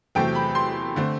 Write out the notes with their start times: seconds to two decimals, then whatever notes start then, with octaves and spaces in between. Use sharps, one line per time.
0.15 E2 C3 F#3 A3 C4 G5
0.35 B5
0.55 C6
0.96 D3 A3 C4